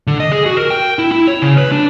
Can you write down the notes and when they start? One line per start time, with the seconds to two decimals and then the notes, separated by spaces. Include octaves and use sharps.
0.07 D3
0.20 D#5
0.32 G#4
0.46 F#4
0.58 A#4
0.71 G5
0.99 E4
1.12 E4
1.27 C#5
1.42 C#3
1.58 B4
1.72 D4